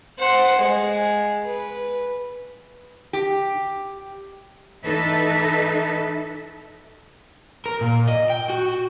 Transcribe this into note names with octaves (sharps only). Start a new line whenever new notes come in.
C5 F#5
G#3
B4
G4
E3 D#4 A4 B4 E5
A#4
A#2
D#5
G5
F#4